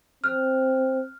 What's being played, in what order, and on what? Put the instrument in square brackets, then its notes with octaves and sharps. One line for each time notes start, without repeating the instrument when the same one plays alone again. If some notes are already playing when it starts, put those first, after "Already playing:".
[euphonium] C4 [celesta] F6 F#6